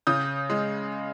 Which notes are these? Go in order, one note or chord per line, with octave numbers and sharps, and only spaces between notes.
C#3 D#6 G6
G#3